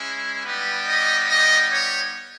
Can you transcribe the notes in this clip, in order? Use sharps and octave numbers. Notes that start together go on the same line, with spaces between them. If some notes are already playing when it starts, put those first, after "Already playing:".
Already playing: G#3 C#4 E4
G3 B3 D#4 G4 B4
D#5
D#5
C#5